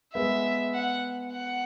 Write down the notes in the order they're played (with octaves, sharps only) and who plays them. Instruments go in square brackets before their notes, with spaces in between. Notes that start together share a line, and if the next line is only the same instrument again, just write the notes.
[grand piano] G#3 B3 [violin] E5
[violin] F#5
F#5